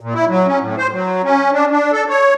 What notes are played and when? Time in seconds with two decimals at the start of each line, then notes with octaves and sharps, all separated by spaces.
0.01 A#2
0.14 E4
0.28 F#3
0.47 C#4
0.60 A2
0.78 C5
0.92 F#3
1.24 C#4
1.53 D4
1.71 D4
1.92 A4
2.09 C#5